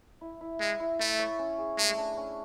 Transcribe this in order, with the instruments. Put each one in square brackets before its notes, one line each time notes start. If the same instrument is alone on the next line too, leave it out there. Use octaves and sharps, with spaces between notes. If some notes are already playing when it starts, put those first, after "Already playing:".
[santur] E4
E4
[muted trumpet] G#3 [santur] E5
[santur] E4
[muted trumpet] A3 [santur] E4
[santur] C#5
C#4
G#4
[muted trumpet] G#3 [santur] A3
[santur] D4
C#4